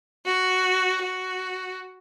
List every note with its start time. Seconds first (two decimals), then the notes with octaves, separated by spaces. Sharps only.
0.26 F#4
1.02 F#4